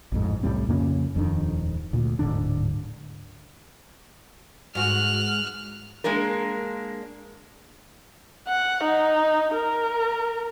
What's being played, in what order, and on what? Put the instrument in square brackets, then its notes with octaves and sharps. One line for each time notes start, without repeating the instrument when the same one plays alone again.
[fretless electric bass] A1 F2 G#2
C2 A2 G3 C4
F2 C#3 A#3 C#4
D#1 F2 D#3 D4
D2 A#2
D1 G#2 D3 D4
[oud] G#2 F#4 [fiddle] F6 F#6
[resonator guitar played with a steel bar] G#3 A#3 D4 A#4
[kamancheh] F#5
D#4
A#4